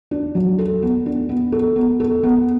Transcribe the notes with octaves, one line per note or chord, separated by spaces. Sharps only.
D4
F#3
A4
B3
D4
B3
A4
B3
A4
B3